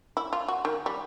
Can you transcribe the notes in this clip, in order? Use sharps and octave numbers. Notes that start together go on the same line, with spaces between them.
E4
F4
F#4
D#3
G3